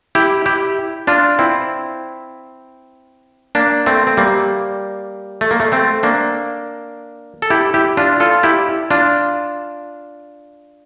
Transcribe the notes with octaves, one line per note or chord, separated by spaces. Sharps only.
E4 G4
E4 G4
D4 F4
C4 E4
A#3 D4
A3 C4
C4
G3 A#3
A3
A#3
A3
A3 C4
A#3 D4
A4
E4 G4
E4 G4
D4 F4
F4 A4
E4 G4
D4 F4